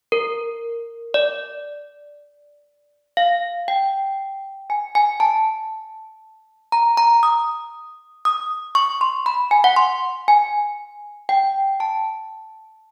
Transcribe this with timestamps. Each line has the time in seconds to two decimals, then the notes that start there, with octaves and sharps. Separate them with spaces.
0.12 A#4
1.14 D5
3.17 F5
3.68 G5
4.70 G#5
4.95 G#5
5.20 A5
6.72 A#5
6.97 A#5
7.23 D#6
8.25 D#6
8.75 C#6
9.01 C6
9.26 B5
9.51 G#5
9.64 F#5
9.76 C6
10.28 G#5
11.29 G5
11.80 A5